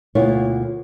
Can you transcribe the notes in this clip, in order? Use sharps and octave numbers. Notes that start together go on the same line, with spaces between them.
D2 B2 A#3 E4 F4 C#5